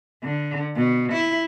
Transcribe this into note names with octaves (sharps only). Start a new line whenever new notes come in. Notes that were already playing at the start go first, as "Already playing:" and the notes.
D3
B2
E4